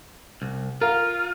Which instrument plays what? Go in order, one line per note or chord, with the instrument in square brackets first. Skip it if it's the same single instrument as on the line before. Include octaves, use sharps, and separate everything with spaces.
[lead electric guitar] C2
[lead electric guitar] F4 [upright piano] A#4 F5